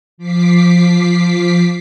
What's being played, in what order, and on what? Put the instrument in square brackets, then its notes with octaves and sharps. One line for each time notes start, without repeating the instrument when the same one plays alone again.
[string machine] F3 D6 B6 C7